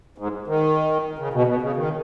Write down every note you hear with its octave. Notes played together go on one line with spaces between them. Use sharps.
G#2
D#3
C#3
B2
B2
C#3
D#3